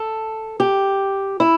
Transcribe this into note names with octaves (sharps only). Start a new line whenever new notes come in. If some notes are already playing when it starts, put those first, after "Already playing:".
Already playing: A4
G4
E4